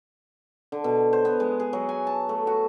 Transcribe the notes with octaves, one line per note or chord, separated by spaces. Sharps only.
D3
B2
C5
B3
G#3
G#4
F#3
G#5
A5
A3
F#4